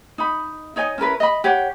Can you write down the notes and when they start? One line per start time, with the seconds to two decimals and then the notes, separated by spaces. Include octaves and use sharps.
0.18 D#4 B5
0.76 D#4 C#5 D#5 G#5
0.98 C#4 E4 A#4 B4
1.20 D#5 B5
1.44 G4 C#5 F#5